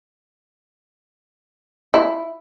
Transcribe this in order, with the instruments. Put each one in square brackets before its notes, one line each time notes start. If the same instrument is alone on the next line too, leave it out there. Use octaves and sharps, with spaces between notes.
[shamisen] E4